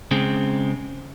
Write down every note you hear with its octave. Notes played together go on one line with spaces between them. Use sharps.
C#3 G#3 C4